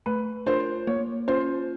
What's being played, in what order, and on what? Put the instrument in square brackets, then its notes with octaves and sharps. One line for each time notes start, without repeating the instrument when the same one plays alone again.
[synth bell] A3 [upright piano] B4
[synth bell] D4 F4 A#4 [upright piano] C5
[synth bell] A#3 [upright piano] C#5
[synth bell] C#4 F4 [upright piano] C5